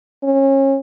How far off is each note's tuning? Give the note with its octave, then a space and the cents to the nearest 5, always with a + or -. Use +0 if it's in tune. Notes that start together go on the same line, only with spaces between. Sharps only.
C#4 -30